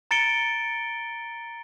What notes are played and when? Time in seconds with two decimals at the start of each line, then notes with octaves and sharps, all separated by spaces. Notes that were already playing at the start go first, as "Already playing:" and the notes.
0.11 A#5 A6 C#7 D7 G7